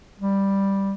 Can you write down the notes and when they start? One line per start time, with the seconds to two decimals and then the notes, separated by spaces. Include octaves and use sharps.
0.20 G3